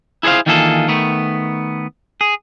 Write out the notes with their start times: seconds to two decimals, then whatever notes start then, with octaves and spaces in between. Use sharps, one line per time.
0.23 E4 G#4 A4 C5 F5
0.46 D#3 E3 A#3 F4 G#4 A4
0.88 D#3 A3 B3
2.21 G#4